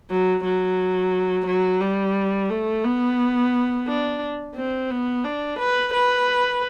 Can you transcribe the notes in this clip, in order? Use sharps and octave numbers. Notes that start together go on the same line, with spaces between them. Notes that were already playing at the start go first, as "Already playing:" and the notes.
F#3
F#3
F#3
G3
A3
B3
D4
C4
B3
D4
B4
B4